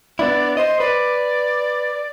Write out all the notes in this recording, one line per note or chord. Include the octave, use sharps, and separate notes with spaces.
B3 D4 E4 D5
C5 D#5
B4 D5